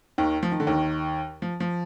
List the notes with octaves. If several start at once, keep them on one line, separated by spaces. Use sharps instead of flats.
D#2 D#3
F3
D#3
D3
D#2 D#3
F3
F3